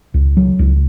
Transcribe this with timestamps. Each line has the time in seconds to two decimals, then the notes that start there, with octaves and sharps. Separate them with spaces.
0.14 C#2
0.37 F#3
0.59 C#2